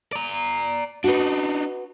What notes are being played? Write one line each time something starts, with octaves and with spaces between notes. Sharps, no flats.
D5 A#5
D4 D#4 F#4 B4